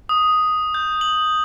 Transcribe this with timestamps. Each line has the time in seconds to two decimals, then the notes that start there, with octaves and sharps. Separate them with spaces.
0.09 D#6
0.74 G6
1.01 F#7